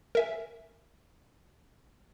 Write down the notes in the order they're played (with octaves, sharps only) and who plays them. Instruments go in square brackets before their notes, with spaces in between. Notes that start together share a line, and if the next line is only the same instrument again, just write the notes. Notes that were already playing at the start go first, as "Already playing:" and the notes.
[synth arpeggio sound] A#4 E5 G#5